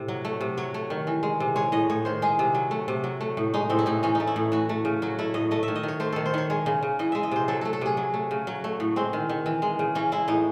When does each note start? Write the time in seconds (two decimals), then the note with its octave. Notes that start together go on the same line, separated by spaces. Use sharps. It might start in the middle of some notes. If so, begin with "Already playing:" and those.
Already playing: A2 C3
0.08 F#3
0.25 A3
0.41 C3
0.57 F#3 C#5
0.74 A3
0.90 D#3
1.07 E3
1.23 G#3
1.40 C3
1.56 G#3 C#5
1.72 A2 D#5
1.90 A2 C#5
2.05 D#3 C5
2.22 G#3 G#4
2.39 C3
2.55 F#3
2.71 A3
2.88 C3
3.04 F#3
3.21 A3
3.37 A2
3.54 G#3 D#4
3.70 A2 C4
3.79 E4
3.86 A2 D#4
4.03 E3 C#4
4.15 D#4
4.20 A3
4.27 E4
4.36 A2
4.52 E3 F#4
4.69 A3
4.85 C#3
5.02 F#3 F#4
5.19 A3 E4
5.34 A2 D#5
5.51 A3 D#5
5.63 E5
5.68 D#3
5.76 D#5
5.83 D#3 C#5
6.00 A3 C5
6.13 D#3 A4
6.26 C5
6.34 D#3 C#5
6.50 G#3 C#5
6.66 C#3
6.83 C#3
6.99 E3 D#5
7.12 G#3 E5
7.23 D#5
7.31 C3 C5
7.48 F#3 A4
7.61 A3 A4
7.73 A4
7.81 C3 G#4
7.97 F#3
8.14 A3
8.31 C#3
8.47 F#3
8.64 A3
8.80 A2
8.96 G#3 C4
9.13 D#3
9.29 D#3
9.46 E3
9.62 G#3
9.79 C#3
9.95 E3 C#4
10.12 G#3 E4
10.28 A2 D#4